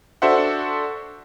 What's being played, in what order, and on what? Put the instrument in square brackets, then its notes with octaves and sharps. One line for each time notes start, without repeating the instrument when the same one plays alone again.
[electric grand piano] D4 F#4 A4 C5 E5 F#5